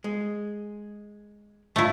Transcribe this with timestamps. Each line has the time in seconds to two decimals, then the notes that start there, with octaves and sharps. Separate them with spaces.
0.04 G#3
1.76 C#2 G2 A3 E4 F4